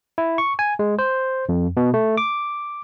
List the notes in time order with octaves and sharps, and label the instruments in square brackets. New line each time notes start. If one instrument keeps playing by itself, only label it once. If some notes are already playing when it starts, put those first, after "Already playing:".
[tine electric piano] E4
C#6
G#5
G#3
C5
F2
B2
A3
D6